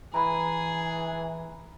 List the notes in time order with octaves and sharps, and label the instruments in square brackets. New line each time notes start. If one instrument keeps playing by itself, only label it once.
[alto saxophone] E3 [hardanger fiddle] G#4 [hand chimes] A#5 B5